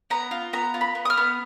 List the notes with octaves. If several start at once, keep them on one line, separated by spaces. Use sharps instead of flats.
B3 A#5
F4
B3 A#5
F4
B5
B3
D#6
F6
B3